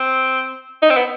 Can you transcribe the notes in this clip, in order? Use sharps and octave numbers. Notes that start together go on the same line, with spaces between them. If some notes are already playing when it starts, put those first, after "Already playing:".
Already playing: C4
D#4
C4
B3